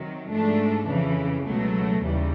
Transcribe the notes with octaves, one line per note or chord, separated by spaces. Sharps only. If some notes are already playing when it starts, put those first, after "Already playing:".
Already playing: C3 D#3 F#3
G#2 F3 A3 D4
F2 C#3 E3
C#2 B2 F#3 A3
D#2 C#3 E3 G3